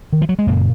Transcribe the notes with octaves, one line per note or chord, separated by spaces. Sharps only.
D#3
F3
F#3
G#3
F#1 F#2 A#2 C#3 A#3